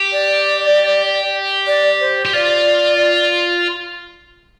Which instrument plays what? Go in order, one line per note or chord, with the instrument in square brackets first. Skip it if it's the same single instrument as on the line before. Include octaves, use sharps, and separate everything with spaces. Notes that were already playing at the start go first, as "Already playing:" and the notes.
Already playing: [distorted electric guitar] G4
[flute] D5
D5
C5
[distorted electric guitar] G4
[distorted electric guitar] F4 [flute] D5